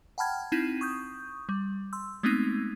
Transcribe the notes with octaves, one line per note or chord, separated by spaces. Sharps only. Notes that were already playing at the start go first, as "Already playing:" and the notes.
F#5 G5 A5 B5 F6 G#6
C4 D#4 E4 G#6 D#7
C#6 D#6 G6
G3
C6 E6
G#3 A3 B3 C4 D#4 G#6